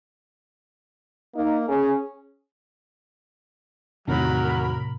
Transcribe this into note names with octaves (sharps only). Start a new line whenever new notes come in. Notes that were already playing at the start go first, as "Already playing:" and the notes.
A#3 D#4
C#4 G#4
E2 A2 C3 D#3 F#3 A#4 B5